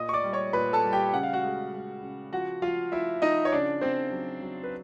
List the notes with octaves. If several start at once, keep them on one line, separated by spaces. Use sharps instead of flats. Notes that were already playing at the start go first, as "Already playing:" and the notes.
Already playing: A#2 D#5 D#6
C#6
D5 D6
G3
C#5 C#6
A#2 B4 B5
A4 A5
G3
G4 G5
C#3 F#5
F5
F#4 F#5
G#3
G#3
C#3
F3 F#4 F#5
F3 F4 F5
F3 E4 E5
F3 D#4 D#5
C#5
C#3 D4 D5
C#3 C4 C5
F#3
F#3
B4